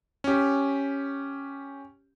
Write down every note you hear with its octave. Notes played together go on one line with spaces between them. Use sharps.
C#4 G4